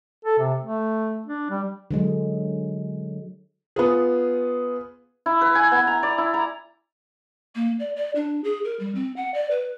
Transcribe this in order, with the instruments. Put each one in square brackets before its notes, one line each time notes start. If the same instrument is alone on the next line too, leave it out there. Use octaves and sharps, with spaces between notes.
[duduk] A4
C3
A3
D4
G3
[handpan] D3 F#3 G#3
[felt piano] B3 F4 G#4
[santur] E4
B4
G#5
B3
A#5
D5
E4
A#5
[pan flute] A#3
D5
D5
D4
G#4
A#4
G3
C4
F#5
D5
B4